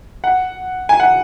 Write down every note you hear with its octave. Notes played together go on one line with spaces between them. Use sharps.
F#5
G#5
F#5